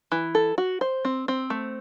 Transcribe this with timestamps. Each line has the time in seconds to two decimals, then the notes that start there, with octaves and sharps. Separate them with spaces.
0.12 E3
0.35 A4
0.58 F#4
0.81 C5
1.05 C4
1.28 C4
1.50 A3